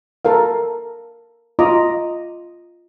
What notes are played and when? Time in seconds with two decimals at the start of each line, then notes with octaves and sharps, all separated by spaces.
0.25 A4 A#4 F5
1.59 F4 D#5 A#5 D6